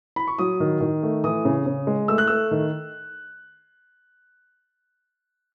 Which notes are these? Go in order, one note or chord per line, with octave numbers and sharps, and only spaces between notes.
B5
C#6
F#3 D#6
D#3
D#3
A3
E3 D#6
C#3
C#3
G#3
A3 E6
F#6
A3 E6
D#3